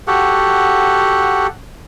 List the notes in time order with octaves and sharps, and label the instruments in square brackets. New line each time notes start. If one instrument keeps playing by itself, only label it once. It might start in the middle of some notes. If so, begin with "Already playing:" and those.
[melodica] F#4 G4 A4 F#5